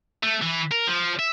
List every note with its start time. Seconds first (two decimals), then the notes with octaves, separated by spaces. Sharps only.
0.23 A3
0.42 E3
0.72 A#4
0.88 F3
1.19 E5